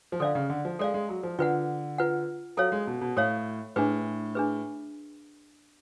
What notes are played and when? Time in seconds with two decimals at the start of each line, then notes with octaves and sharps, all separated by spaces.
0.12 F3
0.20 D3 A4 D5 F5
0.35 C#3
0.50 D3
0.65 F3
0.79 G#3 A4 D5 F5
0.94 G#3
1.09 F#3
1.23 F3
1.39 D3 F4 B4 F#5
1.98 F4 B4 F#5
2.57 F#3 A4 C#5 F5
2.72 G#3
2.87 B2
3.01 B2
3.17 A2 A4 C#5 F5
3.76 A2 D4 G#4 B4
4.35 D4 G#4 B4